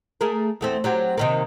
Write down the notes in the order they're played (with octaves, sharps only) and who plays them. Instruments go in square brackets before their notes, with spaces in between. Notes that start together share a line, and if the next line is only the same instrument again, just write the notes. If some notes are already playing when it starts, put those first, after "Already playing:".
[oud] A3 G#4 A#4
E2 A3 C4
F#3 C4 G4
C3 D#3 A#3